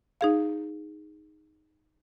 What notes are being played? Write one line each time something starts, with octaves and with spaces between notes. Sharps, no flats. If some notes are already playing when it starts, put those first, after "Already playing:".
D#4 G#4 F5